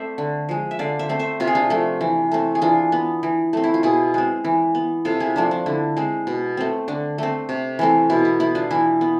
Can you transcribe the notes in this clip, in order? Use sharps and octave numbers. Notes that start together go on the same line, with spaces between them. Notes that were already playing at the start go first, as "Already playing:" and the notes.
Already playing: A3 C4 C5 D5 E5
D3
F3 G#3
E5
D3 D5 F5
C5 E5
A3 C4
C5 E5
C3 F4
G#4
D4 F4
F3 A3
E3
A3 C4
G#4
E3 D4 F4
B3
E3
A3 C4
E4
F4
B2 E4 G#4
G#3 C4
E3
B3
C3 F4 A4
E4 G#4
F3 A3 C4 D4
D4
D3 E4
G#3 C4
B2
A3 C4
D3 D4
A3 C4
C3
E3 A3 C4
B2 E4
E4
B3 E4
D4 F4
E3 E4
B3